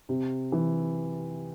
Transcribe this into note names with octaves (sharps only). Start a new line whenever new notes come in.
C3
E3